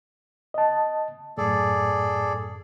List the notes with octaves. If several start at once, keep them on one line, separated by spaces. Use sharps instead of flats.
D#5 A5
F#2 A2 G#4 A4 D5